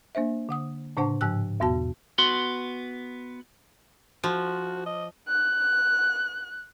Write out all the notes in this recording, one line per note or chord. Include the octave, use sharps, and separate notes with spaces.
A#3 D4 C5 E5
D3 F#5 D#6
A2 C#3 D4 C5 F#5 A5
G#2 F3 G5 E6 F#6
E2 B2 B3 F#4 A5
B3 F#4 C6
F3 F#4
D#5
F#6